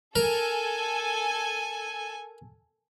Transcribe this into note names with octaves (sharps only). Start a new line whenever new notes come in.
A4 A#4 G#5